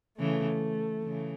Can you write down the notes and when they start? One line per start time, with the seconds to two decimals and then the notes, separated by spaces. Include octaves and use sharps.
0.19 C#3 E3 A3
1.03 C#3 E3